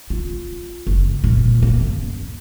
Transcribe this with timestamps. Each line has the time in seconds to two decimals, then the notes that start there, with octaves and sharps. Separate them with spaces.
0.10 F4
0.87 F#1
1.24 A#2
1.60 D2 A#3
1.80 F#2 A#3